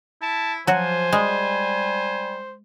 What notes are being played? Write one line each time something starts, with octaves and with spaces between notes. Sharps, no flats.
E4 A5
F3 F#3 F#4 C5 G#5
G3 G#3